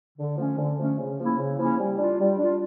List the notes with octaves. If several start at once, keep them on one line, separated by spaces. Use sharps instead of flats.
D3
F3 A3 C#4
D3
F3 A3 C#4
C#3
F3 A#3 C#4 E4
C#3
F3 A#3 C#4 E4
G3
D4 F4
G3
D4 F4